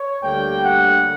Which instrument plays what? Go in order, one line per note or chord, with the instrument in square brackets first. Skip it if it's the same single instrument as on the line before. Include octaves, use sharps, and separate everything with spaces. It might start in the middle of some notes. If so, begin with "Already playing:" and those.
Already playing: [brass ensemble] C#5
D2 D3 G3 A#3 G5
F#5